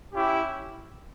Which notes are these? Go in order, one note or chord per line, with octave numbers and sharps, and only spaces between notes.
C#4 E4 G4